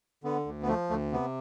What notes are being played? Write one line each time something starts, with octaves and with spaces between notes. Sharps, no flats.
D3 B3
D2
B3
F3 A3
D2 A3
C3 B3